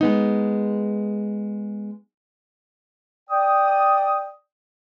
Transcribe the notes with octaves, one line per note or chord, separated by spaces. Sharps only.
G#3 B3 D#4
D5 G5 D#6